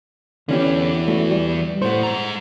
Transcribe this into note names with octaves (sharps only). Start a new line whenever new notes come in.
D3 E3 B3 C#4 G4
A3 F#4
G3
A2 A3 C5 F#5
G#3 A#5